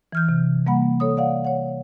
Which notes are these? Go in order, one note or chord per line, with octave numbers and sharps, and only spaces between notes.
E3 F6 G6
C3
G3 A#3 F#5 B5
A4 C#5 D#6
D5 F5 F#5
C#5 F#5